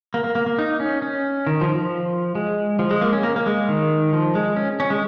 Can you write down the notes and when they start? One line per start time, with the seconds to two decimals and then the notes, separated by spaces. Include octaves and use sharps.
0.14 A#3
0.24 A#3
0.35 A#3
0.46 A#3
0.59 D#4
0.80 C#4
1.02 C#4
1.47 D#3
1.61 F3
1.76 F3
2.35 G#3
2.79 F3
2.91 G#3
3.01 A#3
3.13 C#4
3.23 A#3
3.36 A#3
3.46 G#3
3.69 D#3
4.13 F3
4.35 G#3
4.56 C#4
4.80 C#4
4.90 G#3